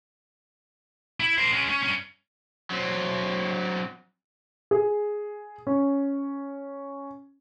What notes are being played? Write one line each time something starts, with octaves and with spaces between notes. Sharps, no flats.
E4
A#4 C5
G#3 C#4
C#4
G2 C#4
F#3 C4
G#4
C#4